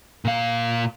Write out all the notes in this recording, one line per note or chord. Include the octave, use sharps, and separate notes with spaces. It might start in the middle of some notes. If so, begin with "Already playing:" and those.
A#2 F5